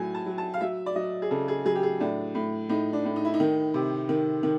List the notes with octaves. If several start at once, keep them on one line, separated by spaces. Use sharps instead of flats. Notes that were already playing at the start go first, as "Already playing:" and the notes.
Already playing: A2 F#3 G#5
A5
F#3
A5
F5
F#3 E5
D5
F#3 D#5
G#4
C#3 A4
G#4
F#3 G#4
G4
G#4
A2 D4
A2
A2 D#4
D4
A2
D#4
E4
D#4
D#3
C3
D#3
D#3